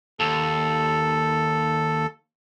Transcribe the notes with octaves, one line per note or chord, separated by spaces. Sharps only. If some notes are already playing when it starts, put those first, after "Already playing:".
D#2 A4